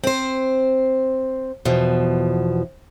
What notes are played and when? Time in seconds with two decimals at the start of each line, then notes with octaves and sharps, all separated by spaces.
0.04 C4 C5
1.65 E2 B2 F3